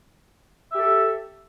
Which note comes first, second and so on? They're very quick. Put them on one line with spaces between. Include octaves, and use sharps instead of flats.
E5 G4 A4